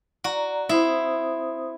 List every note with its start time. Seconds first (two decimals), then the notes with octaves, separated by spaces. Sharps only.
0.24 F#4 D5 A#5
0.69 C4 E4 C5 D#6